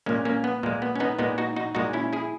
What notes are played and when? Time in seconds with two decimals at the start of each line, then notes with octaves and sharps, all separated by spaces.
0.06 A#2 G#3 A#3 C#4
0.25 A#3 C#4
0.44 B3
0.63 A#2 G#3 A#3
0.82 B3
0.96 C#4
1.00 B3 D#4
1.19 A#2 G#3 B3 D#4
1.38 D#4 F#4
1.56 D#4 F#4
1.75 A#2 G#3 D#4 F#4
1.93 C#4 E4
2.13 E4 G#4